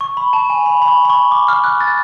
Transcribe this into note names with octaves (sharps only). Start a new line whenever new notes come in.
C#6
B5
A5
G#5
B5
B5
C#6
B5
C#6
D6
F6
F#6
F#6 A6